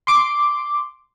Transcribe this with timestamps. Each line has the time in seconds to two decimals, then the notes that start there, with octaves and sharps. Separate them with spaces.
0.07 C6 D6